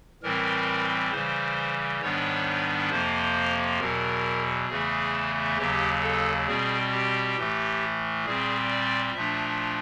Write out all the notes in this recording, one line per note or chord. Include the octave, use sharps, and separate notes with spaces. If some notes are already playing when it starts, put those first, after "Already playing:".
A2 E3 G3 C4 A#4
C#3 E3 G3 C5
G#2 D#3 G3 B3 D4 C#5
F2 C3 F3 A#3 C5
E2 B2 F#3 A#4
E2 C#3 E3 A3 G#4
D#2 C#3 F#3 G4
A4
B2 G3 C4 G#4
G4
A2 E3 A3
A#2 G3 C4 G#4
D5
A#2 F3 A3 D4 E5